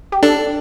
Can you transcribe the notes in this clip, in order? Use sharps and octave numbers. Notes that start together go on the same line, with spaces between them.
G4
D4 A4